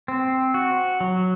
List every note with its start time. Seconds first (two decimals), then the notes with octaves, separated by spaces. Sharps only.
0.08 C4
0.54 F#4
1.01 F#3